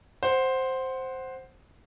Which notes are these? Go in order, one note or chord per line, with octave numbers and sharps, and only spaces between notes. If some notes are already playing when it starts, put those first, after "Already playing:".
C5 F#5